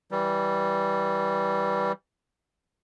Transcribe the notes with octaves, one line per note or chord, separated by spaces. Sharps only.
E3 G3